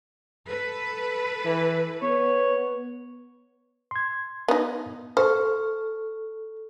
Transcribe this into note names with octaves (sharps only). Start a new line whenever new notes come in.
A4 B4
E3
B3 C#5
C6 G#6
B3 D#4
A4 C5 C#6 F6